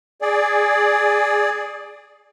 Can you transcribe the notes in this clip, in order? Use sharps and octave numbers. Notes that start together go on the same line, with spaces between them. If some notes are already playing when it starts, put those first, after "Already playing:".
G#4 D5